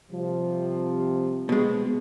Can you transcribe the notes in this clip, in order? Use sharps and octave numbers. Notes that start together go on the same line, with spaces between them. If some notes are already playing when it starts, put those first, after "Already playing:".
C3 F3 G3
B2 G#3